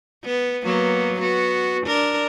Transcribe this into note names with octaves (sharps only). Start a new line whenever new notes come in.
B3
F#3 A#3 B3
B3 F#4
D4 A#4